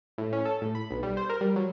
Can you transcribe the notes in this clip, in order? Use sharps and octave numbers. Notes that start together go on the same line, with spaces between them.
A2
C#4
A4
A2
B5
B1
G3
C5
A#4
G3
F#3